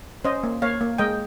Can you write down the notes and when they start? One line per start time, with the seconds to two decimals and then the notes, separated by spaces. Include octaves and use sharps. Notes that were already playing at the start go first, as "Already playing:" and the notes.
0.25 C#4 C5 D#5
0.43 A#3
0.62 A#3 C#5 F5
0.81 A#3
0.98 G#3 D#5 G5